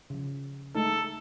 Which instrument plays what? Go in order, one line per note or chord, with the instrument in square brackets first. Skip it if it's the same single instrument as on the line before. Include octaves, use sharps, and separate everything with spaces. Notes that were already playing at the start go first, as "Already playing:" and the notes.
[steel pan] C#3 F3
[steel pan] G#3 A3 D#4 [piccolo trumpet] A4